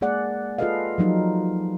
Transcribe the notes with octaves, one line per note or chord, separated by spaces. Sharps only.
G#3 A#3 G#4 D5 F#5
F4 G#4 A4 B4 D#5 F5
F3 F#3 D#4